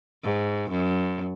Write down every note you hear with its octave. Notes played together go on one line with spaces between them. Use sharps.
G#2
F#2